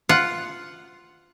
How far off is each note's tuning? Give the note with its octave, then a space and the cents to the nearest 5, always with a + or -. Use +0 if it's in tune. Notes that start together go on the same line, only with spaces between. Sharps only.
F4 +0 F#5 +0